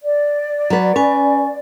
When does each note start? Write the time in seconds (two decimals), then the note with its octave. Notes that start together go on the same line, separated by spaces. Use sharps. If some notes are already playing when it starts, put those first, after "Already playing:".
0.03 D5
0.70 F#3 B4
0.96 C#4 B4 G#5